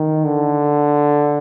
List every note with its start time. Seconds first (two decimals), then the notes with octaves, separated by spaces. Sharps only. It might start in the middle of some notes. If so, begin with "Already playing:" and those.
Already playing: D#3
0.25 D3